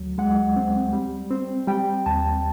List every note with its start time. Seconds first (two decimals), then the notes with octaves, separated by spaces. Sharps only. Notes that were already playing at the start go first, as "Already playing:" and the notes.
Already playing: D2 F#3
0.18 G#3 F#5
0.56 C4
0.93 G3
1.31 C4
1.68 G3 G5
2.06 D#2 A5